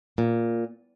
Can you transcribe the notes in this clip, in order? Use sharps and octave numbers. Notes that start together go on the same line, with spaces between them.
A#2